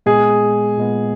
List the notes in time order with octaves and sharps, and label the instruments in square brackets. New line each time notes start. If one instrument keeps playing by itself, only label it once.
[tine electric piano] A#2 G#3 B3 [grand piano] G#4
[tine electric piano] A#2 G#3 B3